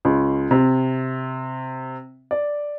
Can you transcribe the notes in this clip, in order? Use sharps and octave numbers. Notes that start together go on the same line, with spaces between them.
C#2
C3
D5